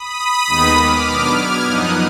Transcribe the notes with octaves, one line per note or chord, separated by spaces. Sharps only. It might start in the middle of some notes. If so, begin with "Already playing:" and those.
Already playing: B5 D#6
D#2 D#3 G#3 B3 D#4
D6 F6
B2 F#3 B3 D4
F6 G#6
F#2 F3 B3 D#4 D#6 F#6